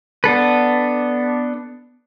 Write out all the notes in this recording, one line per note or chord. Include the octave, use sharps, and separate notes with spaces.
B3 D4 A4 B4